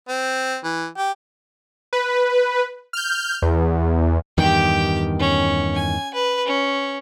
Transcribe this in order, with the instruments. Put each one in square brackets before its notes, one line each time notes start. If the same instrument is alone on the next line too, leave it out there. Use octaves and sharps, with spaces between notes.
[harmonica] C4
E3
G4
[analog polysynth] B4
F6 G6
E2
[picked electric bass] E2 G2 D#3 [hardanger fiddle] G4 G5
[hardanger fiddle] C#4
G#5
B4
C#4